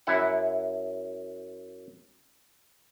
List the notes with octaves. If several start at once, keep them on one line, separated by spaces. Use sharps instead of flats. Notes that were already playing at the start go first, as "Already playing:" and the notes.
F#2 E4 F#5